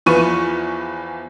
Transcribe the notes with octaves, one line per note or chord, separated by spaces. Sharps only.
E2 E3 F3 B4 C#6 D#7